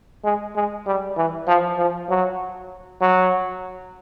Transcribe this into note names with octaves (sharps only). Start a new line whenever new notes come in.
G#3
G#3
G3
E3
F3
F3
F#3
F#3